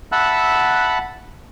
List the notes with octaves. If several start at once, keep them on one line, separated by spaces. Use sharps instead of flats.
E5 F#5 A5 B5 E6 F#6